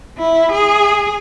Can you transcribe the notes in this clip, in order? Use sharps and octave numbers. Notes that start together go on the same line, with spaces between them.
E4
G#4